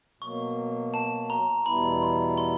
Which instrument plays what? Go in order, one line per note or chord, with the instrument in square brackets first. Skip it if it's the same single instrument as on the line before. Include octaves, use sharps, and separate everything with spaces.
[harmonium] B2 F#3 A#3 [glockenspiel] C#6
[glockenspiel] A5
A#5
[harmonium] E2 B2 G3 B3 E4 [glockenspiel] B5
[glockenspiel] C6
C6